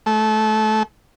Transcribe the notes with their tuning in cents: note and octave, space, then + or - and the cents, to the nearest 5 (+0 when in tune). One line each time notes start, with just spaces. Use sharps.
A3 -25